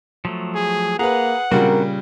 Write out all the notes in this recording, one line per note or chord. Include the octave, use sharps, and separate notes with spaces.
F3 F#3 A3
G#4
A#3 G#4 B4 F#5 A#5
A#2 C#3 G3 C4 D4 F#4 A#4